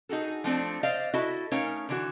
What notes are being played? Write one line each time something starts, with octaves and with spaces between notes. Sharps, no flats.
D#4 F#4 G#4 A4
F3 A3 C4 D4
C5 D5 D#5 F5
E4 F#4 A4 D#5 E5
A3 C#4 D#4 A#4 C#5 F5
D3 E3 F#4